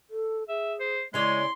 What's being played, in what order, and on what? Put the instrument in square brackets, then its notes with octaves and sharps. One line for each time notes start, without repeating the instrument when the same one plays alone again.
[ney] A4
[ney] G#4 [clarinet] E5
[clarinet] C5
[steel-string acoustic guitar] C#3 C#5 D5 [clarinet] G#3 [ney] E4 [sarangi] C6